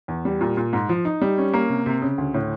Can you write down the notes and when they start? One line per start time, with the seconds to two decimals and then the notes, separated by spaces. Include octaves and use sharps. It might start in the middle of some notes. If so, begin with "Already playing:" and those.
0.08 E2
0.25 G3
0.41 A#2
0.57 A#2
0.73 G#2
0.89 F3
1.05 D#4
1.21 G3
1.38 C#4
1.54 A#3
1.69 C3
1.86 C3
2.02 C#3
2.18 D2
2.34 A2